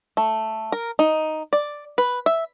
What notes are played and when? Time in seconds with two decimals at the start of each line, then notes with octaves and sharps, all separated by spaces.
0.17 A3
0.72 A#4
0.99 D#4
1.53 D5
1.98 B4
2.26 E5